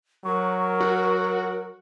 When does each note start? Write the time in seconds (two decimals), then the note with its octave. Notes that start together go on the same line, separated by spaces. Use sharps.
0.25 F#3 A#4 C#6
0.80 F#4